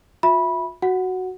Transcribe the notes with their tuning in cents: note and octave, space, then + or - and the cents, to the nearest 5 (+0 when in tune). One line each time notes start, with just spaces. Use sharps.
F4 +40 E5 +0 B5 -15
F#4 +0 F#5 +0